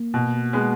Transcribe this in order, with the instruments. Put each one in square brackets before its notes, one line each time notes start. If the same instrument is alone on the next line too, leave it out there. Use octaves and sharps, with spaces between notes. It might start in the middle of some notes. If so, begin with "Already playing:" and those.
Already playing: [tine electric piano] A#3
[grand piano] B2
G#3 B3